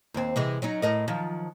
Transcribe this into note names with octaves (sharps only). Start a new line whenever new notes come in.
D#2 C4
C3 E3 G#3
F#3 C#4 D#4
A2 A#4 D#5
D#3 F3 F#3